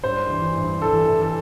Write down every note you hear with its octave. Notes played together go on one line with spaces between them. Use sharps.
G2 C5
E3
G2
E3 A4
E3
A4